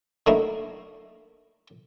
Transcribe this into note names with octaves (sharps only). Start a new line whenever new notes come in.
D3 F#3 A3 A#3 D#4 E4